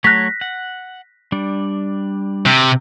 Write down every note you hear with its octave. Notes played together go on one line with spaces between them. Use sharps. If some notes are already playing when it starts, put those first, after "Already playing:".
F#3 A3 C#5 F#6 A#6 B6
F#5
G3 D4
C3